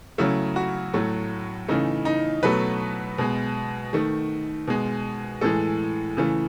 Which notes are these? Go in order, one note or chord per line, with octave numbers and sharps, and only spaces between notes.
C#3 F#3 A3 E4
F#4
A2 F#3 A3
C#3 E3 A3 D#4
D#4
B2 F#3 A3 B4
B2 G#3
D#3 A3
B2 G#3
A2 E3 G#3 A4
C#3 E3 A3